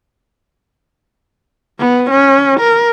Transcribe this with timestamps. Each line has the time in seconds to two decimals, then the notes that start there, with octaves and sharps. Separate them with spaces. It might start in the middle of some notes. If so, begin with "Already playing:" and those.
1.79 B3
2.11 C#4
2.60 A#4